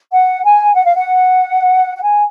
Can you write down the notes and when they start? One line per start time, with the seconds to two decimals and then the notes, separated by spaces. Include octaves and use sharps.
0.12 F#5
0.44 G#5
0.75 F#5
0.85 F5
0.96 F#5
1.96 F#5
2.02 G#5